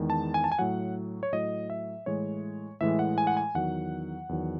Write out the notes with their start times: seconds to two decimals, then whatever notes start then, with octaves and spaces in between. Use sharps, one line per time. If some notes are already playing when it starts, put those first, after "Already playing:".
Already playing: E2 D#3 G#3
0.10 A5
0.34 G#5
0.44 A5
0.52 G#5
0.59 A2 F#3 F#5
1.23 C#5
1.33 A2 F#3 D#5
1.70 E5
2.06 A2 E3 G#3 C#5
2.81 A2 E3 G#3 E5
2.99 F#5
3.18 G#5
3.27 F#5
3.37 G#5
3.54 E2 D#3 F#3 F#5
4.29 E2 D#3 F#3